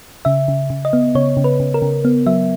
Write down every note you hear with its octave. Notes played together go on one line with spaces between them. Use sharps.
C#3 E5
C#3
C#3
D#5
B3
C#3 C#5
C#3
B4
C#3
A#4
C#3
B3
F#3 E5